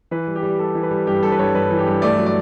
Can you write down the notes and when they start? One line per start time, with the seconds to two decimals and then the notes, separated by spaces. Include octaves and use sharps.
0.11 E3 B4
0.27 G3
0.36 G4
0.43 G3
0.59 G3 A4
0.75 E3
0.83 B4
0.91 G3
1.07 G2 G4
1.23 G2 A4
1.32 B4
1.39 G2 C#5
1.54 G2 B4
1.71 E3
1.78 G4
1.87 G2
2.02 A3 D5
2.18 F#3
2.26 D5